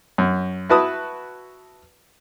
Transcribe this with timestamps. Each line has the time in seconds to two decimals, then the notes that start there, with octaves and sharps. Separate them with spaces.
0.18 F#2
0.69 E4 F#4 B4 A5 D#6